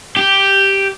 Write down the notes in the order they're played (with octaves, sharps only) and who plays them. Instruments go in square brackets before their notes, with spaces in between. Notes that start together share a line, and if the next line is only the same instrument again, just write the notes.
[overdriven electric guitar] G4